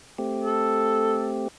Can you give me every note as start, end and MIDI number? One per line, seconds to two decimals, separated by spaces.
0.18 1.48 57
0.18 1.48 60
0.18 1.48 67
0.44 1.27 69